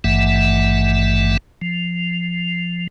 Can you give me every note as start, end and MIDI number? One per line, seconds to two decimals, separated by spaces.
0.04 1.37 32
0.04 1.37 43
0.04 1.37 52
0.04 1.37 57
0.04 1.37 76
0.04 1.37 78
1.62 2.87 53